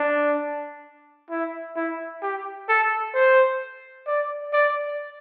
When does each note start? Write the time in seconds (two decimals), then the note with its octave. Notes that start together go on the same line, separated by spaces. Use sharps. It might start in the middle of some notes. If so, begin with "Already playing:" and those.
Already playing: D4
1.30 E4
1.76 E4
2.22 G4
2.69 A4
3.14 C5
4.07 D5
4.53 D5